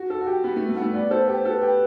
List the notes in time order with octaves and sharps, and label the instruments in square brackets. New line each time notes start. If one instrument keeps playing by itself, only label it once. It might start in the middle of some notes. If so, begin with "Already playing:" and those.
Already playing: [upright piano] F#4
A4
F#4
G4
B3
A3
A3
B3
A3
[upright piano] B3 [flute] D5
[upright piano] A4 [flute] C5
[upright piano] G4 [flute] B4
[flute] C5
[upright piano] A4 [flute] B4
[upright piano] G4